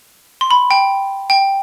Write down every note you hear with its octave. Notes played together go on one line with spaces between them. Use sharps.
C6
B5
G5
G5